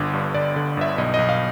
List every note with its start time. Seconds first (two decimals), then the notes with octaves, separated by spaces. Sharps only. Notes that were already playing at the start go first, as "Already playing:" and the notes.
Already playing: G1 D3
0.13 G2
0.34 G1 D5
0.56 D3
0.77 G1 E5
0.98 B1 D#5
1.14 B1 D#5
1.29 F5